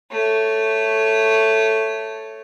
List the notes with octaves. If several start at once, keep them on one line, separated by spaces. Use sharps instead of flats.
A3 C#5